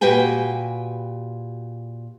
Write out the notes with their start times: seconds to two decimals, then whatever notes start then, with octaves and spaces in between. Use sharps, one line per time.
0.01 A#2 F#4 G4 B4 G5 G#5